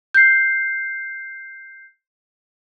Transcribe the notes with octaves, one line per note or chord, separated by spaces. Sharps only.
G6 C7